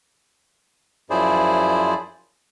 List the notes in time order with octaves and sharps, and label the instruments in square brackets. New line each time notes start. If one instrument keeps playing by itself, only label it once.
[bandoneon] F#2 F3 E4 G#4 C5 D5